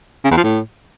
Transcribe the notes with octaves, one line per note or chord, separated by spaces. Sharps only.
C#3
E2
F3
A2